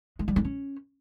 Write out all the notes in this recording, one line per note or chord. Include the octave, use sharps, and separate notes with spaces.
G#3
G3
D4
C#4